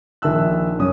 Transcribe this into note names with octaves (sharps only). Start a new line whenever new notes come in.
A#1 D#3 E5 A5 E6 F#6
F#2 C#4 D#6